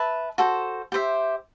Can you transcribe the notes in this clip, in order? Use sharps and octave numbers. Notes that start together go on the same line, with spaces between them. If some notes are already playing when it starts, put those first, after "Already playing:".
Already playing: B4 E5 A5
F#4 A4 C5
G4 C5 E5